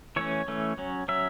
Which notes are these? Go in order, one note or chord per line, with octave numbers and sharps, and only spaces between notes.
E3 A3 C#4 C#5
E3 A3 C#4
F#3 C#4
F#3 C#4 E5